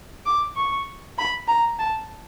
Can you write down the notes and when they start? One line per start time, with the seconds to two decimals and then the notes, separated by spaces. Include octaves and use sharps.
0.26 D6
0.56 C#6
1.18 B5
1.48 A#5
1.79 A5